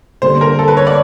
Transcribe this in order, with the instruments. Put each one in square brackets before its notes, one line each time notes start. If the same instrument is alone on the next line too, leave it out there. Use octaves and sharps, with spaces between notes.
[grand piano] D3 G3 A#3 [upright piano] C5
[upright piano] A#4
A4
B4
C#5
D5